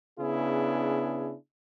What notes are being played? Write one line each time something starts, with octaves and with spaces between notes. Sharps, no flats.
C#3 B3 D4 E4 G#4